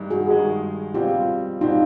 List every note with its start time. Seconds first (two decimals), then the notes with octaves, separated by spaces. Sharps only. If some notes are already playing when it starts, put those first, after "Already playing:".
Already playing: G2 D#3 G#3
0.10 F#4 G#4
0.27 G2 D#3 G#3
0.94 B2 G3 C4 F4 G4
1.61 B2 G3 C4 D#4 F4